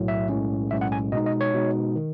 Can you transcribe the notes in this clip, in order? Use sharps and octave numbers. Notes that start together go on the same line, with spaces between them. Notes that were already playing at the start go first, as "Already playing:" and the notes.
Already playing: B1 A2 F#3
E5
B1 A2 G#3 C#4
B1 A2 G#3 C#4 E5
F#5
G#5
B2 G#3 D#4 D#5
D#5
C#5
B2 G#3 D#4
D#3